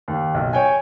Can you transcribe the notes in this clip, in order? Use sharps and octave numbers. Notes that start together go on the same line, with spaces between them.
D#2
B1
C#5 G5 G#5